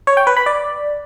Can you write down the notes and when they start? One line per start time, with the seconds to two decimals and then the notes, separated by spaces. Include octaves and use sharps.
0.07 C#5
0.17 G5
0.27 B4
0.37 B5
0.46 D5